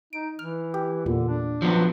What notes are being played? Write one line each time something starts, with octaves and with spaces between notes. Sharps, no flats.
D#4 D7
E3 F6
G4
E2 A#2 D3
D4
F3 F#3 B3